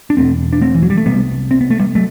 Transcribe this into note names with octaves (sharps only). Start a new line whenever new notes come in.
D4
E2 B2 A3 C4
D4
A3 C4
E3
F#3
G3
A3
C2 C3 G3 B3
C4
B3
A3
G3 B3
F#3 A3